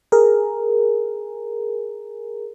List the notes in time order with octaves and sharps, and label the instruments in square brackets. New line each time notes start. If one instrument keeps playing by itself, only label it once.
[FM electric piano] G#4 A#4